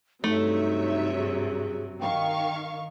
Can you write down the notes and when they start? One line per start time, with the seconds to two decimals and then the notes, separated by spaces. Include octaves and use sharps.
0.24 G2 C3 F#3 A3 D#4 C#5 E5
1.18 G#4
2.00 D#3 F5 G5 C#6